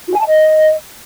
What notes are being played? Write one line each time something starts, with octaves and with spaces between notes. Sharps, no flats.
F4
G#5
A5
D#5